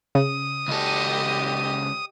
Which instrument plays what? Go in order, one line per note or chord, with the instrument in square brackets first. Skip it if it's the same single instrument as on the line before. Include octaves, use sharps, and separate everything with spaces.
[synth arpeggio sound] C#3 [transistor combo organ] D#6
[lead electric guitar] C#2 A4 [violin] G4 D#5